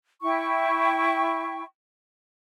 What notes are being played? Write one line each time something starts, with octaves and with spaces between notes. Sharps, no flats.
E4 G5 C#6